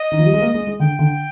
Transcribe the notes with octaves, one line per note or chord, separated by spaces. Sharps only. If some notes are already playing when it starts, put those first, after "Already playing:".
Already playing: D#5
D#3
F3
G3
G#3
A#3
G#3
G#3
D3 G5
D3